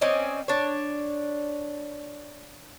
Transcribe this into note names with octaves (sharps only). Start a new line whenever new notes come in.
C4 C#4 D5 D#5
D4 C#5